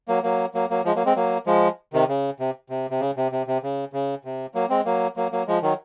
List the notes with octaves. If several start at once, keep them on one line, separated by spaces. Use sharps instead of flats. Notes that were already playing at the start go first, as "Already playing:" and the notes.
F#3 A#3
F#3 A#3
F#3 A#3
F#3 A#3
F3 G#3
F#3 A#3
G#3 C4
F#3 A#3
F3 G#3
C3 D#3
C#3
C3
C3
C3
C#3
C3
C3
C3
C#3
C#3
C3
F#3 A#3
G#3 C4
F#3 A#3
F#3 A#3
F#3 A#3
F3 G#3
D#3 F#3